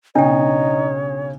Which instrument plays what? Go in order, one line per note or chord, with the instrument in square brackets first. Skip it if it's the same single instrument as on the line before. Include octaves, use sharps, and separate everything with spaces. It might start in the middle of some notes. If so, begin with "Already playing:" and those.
[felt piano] B1 C#3 [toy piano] D4 G5 [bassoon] D#4 [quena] C#5